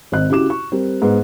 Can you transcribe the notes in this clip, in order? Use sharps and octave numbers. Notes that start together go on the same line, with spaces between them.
G#1 C4 D#5 F#6
C#3 E4 F#4 G4 D6 E7
C#6
G3 C4 A#4
G#2 B3 D#4